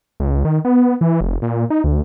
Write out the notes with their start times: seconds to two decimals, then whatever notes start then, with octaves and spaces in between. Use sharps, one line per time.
0.20 C#2
0.45 D#3
0.65 B3
1.01 E3
1.21 F1
1.42 A#2
1.70 D#4
1.84 D2